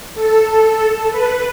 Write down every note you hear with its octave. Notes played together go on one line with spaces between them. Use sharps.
A4
A4
B4